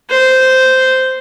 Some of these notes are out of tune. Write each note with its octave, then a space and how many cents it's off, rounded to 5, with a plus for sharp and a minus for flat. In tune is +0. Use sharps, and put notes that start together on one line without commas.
C5 -10